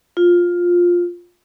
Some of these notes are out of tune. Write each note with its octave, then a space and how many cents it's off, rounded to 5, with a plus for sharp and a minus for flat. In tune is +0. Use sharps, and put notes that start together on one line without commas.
F4 +10